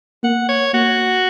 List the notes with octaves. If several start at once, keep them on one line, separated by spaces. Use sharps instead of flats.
A#3 F#5
C#5
A#3 F#4